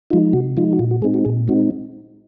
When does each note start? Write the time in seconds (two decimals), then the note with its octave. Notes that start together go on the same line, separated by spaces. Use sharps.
0.10 F3 G#3 D#4 F4
0.33 C3 F#4
0.57 F3 G#3 D#4 F4
0.73 F#4
0.79 A#2 F4
0.91 F#4
1.02 G#3 C4 D#4 G#4
1.14 F#4
1.25 A#2 G#4
1.48 G#3 C4 D#4 F#4